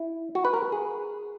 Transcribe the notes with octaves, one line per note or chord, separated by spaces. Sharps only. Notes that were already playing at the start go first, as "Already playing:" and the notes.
Already playing: E4
F#4
B4
A#4
G#4